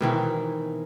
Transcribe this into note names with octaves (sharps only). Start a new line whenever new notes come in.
B2 D#3 E3 C4